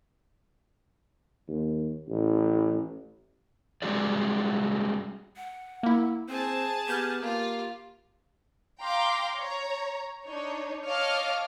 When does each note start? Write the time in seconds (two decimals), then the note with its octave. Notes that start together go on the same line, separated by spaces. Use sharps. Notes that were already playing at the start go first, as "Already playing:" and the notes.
1.48 D#2
2.09 A1
3.82 G3 G#3 C#4 F#4 G#4 D5
5.36 F#5
5.83 A#3 E4
6.29 C4 G#4 C5 A5
6.88 B3 G4 F6 G6 G#6
7.22 A#3 F4
8.81 F5 G5 A#5 C6 D6
9.38 C#5 A#5
10.24 D4 D#4 C#5
10.86 C#5 D#5 F5 A5 D6 F6